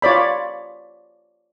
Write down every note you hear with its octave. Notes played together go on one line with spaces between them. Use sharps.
F4 C#5 D5 B5